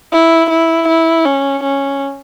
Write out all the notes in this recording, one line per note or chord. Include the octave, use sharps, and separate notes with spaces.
E4
E4
E4
C#4
C#4